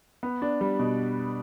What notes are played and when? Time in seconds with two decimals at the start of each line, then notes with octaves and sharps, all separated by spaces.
0.23 B3
0.42 D4
0.61 G3
0.79 B2